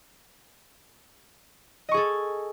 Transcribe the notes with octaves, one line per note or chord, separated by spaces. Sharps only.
G#4 A4 D#5 C#6